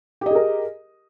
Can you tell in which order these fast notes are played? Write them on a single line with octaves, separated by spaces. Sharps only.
G4 D#5 G#4 A#4